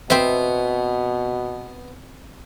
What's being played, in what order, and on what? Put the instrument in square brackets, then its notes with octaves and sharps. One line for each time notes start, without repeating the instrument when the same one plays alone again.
[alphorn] B2 [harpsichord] B3 [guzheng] C4 E5